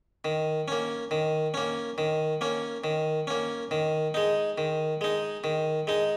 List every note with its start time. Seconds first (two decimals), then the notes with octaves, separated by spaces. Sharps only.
0.25 D#3
0.68 A#3 C#4
1.11 D#3
1.54 A#3 C#4
1.98 D#3
2.41 A#3 C#4
2.84 D#3
3.27 A#3 C#4
3.71 D#3
4.14 G#3 D#4
4.58 D#3
5.01 G#3 D#4
5.44 D#3
5.87 G#3 D#4